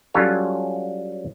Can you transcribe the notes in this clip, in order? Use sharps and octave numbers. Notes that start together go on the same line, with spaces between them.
F#3 G3 C#4 F4 A4 C#5